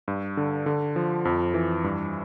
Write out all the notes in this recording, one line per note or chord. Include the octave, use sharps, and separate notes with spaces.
G2
D3
D3
F3
F2
E3
G2